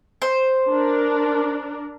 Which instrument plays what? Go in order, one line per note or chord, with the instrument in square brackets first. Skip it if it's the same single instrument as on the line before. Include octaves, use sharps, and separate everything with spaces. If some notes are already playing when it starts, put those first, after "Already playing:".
[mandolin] C5
[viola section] D4 A#4